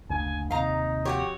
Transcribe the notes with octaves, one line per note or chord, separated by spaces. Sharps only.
F#1 D2 G#5
D#2 C3 D#4 F5 A#5
F2 F#4 G4 C#5